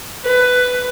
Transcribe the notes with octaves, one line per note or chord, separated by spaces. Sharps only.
B4